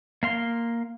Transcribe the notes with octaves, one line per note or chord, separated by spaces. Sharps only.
A#3 F5 C6